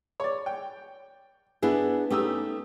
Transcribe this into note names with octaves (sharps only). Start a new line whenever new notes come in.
C#5 D5
G5
B3 D4 E4 G#4
A3 C#4 D#4 G4 D#6 E6